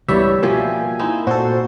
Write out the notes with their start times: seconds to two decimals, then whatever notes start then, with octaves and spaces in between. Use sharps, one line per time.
0.08 C#2 G2 E3 G3 B3 G4 C#5 E5
0.43 B2 F3 A#3 F4 G4 G#5
0.99 C4 D#4 E4
1.27 A#2 F#4 A4 C5